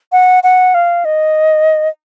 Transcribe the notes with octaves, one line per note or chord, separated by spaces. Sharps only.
F#5
F#5
F5
D#5